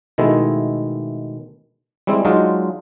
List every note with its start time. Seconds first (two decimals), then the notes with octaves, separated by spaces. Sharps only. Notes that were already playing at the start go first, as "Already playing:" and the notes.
0.18 B2 D#3 G#3 A3 E4
2.07 G3 G#3 C4 E4
2.25 F#3 G#3 D4 D#4 F4